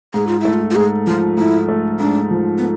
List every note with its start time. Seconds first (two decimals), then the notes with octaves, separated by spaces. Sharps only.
0.14 G#2 G#4
0.27 F4
0.40 A3 E4
0.53 F4
0.71 F4
0.75 G#2 G#4
1.07 F3 F4
1.38 G#2 E4
1.68 A3
2.00 G#2 D4
2.31 F3
2.58 B3